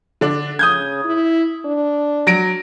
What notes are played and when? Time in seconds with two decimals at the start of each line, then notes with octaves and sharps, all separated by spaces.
0.21 D3 D4
0.59 C#3 D#6 G6 G#6
1.05 E4
1.65 D4
2.27 F#3 A#6 D7